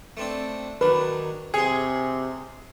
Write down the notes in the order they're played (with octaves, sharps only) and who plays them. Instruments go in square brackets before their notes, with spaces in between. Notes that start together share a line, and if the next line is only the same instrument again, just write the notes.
[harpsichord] A3 C4 D4
[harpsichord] D#3 F#3 D4 [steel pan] B4
[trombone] C3 [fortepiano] G#4 [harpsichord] C#5 C6